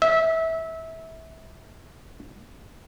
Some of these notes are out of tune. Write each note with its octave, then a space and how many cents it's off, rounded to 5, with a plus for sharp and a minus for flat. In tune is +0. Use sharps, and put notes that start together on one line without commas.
E5 -20